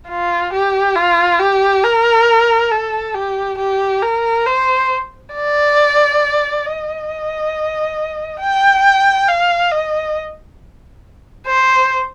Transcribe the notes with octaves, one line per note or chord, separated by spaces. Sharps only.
F4
G4
F4
G4
A#4
A4
G4
G4
A#4
C5
D5
D#5
G5
F5
D#5
C5